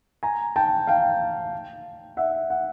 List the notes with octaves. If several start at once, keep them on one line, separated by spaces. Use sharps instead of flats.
G#5 A#5
G5 A5
F5 G5
E5 F#5
F#5